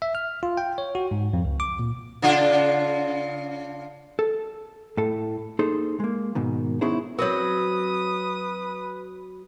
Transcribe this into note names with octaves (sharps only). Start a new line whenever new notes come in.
E5
F6
F4
G5
C#5
F#4
G#2
F2
C#2
D6
A#2
C#3 D4 F4
A4
A2 A4
A#3 D#4 G#4 A4 C5
G#3 A#3
G#2 B2 D#3
B3 C#4 D#4 E4 G#4 C5
F#3 C4 F#4 A#4 B4 C#5 D#6